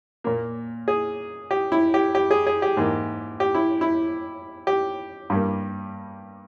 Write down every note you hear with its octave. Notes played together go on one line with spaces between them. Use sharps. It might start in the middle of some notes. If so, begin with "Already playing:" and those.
A#2 A#3
G#4
G4
E4
G4
G4
G#4
G#4
G4
G#2 E3 A#3
G4
E4
E4
G4
G2 G3 A#3